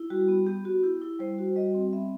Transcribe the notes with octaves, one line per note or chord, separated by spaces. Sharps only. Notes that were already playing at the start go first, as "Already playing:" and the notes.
Already playing: E4
G3 F#4
B3
B3 G4
B3 F#4
E4 G4
E4
G3 C5
F#4
G3 D#5
C4
B3 E5